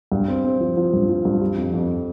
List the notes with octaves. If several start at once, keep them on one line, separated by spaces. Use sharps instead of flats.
G2
C4
C4
F3
F3
G2
F3
G2
G3
F2
F2